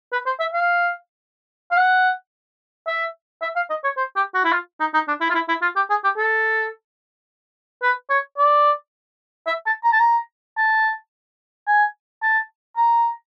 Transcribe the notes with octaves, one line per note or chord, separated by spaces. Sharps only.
B4
C5
E5
F5
F5
F#5
E5
E5
F5
D#5
C#5
C5
G4
F#4
E4
F4
D#4
D#4
D4
E4
F4
E4
E4
F4
G4
G#4
G4
A4
B4
C#5
D5
E5
A5
A#5
A5
A#5
A5
G#5
A5
A#5